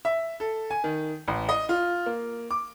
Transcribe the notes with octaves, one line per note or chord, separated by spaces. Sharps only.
E5
A4
G#5
D#3
A1
D#5
F4
A#3
D6